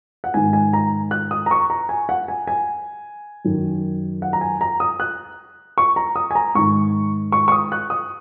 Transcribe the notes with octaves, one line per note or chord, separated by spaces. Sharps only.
F#5
G#2 D#3 G#5
G#5
A#5
F#6
D#6
A#5
C#6
A#5
G#5
F#5
G#5
G#5
F#2 D#3
F#5
A#5
G#5
A#5
D#6
F#6
C#6
A#5
D#6
G#5
A#5
G#2 D#3 C#6
C#6
C#6
D#6
F#6
D#6